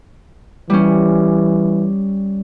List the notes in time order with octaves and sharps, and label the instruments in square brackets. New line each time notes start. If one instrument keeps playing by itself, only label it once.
[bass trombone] E3 [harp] G3 C#4